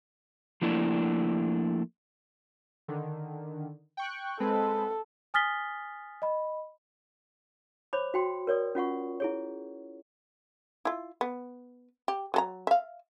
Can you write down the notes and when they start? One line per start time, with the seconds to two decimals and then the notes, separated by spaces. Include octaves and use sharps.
0.62 F3 A3 A#3 D4 E4
2.88 D3 D#3
3.97 G5 C#6 F#6
4.40 G#3 C4 A4 B4
5.34 G#5 D#6 F6 A6 B6 G7
6.22 D#5 B5
7.93 C5 C#5 B5 D6
8.14 F#4 G5 C6
8.47 A#4 C#5 D5 D#6
8.75 C#4 F4 F#5 C#6
9.20 E4 G#4 C#5
10.85 E4 F4
11.21 B3
12.08 G4
12.34 F#3 A4 A#5
12.67 E5 F5